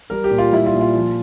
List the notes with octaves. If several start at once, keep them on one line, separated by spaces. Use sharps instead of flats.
G3 A#4
G4
A#2
F4
G3 E4
F4
A#2
F4
F3